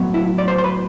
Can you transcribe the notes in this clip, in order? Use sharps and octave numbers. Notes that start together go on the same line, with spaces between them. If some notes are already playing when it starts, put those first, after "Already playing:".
Already playing: A2 F#3 B3
E4
D5
C5
C5
B4